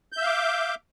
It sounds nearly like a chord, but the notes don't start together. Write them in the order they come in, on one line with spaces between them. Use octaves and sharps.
G6 E5 F5 D6